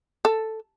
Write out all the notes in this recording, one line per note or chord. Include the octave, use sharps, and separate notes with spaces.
A4